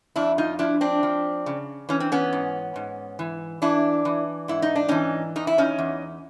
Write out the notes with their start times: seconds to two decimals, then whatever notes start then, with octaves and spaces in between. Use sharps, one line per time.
0.16 F2 D4 E4
0.38 D#4 F4
0.59 F3 D4 E4
0.81 C4 D4
1.03 F3
1.46 C#3
1.89 E3 C#4
2.00 C4
2.12 B3 C#4
2.33 G#2
2.76 G#2
3.19 E3
3.62 E3 D4 E4
4.05 E3
4.48 G#2 E4
4.62 D#4
4.75 D4
4.88 E3 C#4 D#4
5.36 E2 D#4
5.47 E4
5.58 C#4 D#4
5.79 E2